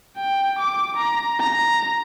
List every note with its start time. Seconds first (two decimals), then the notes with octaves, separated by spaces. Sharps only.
0.17 G5
0.59 D6
0.97 A#5
1.40 A#5